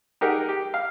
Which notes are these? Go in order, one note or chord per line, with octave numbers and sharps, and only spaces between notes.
D#4 G4 G#4 A#4 F#5
G4
F5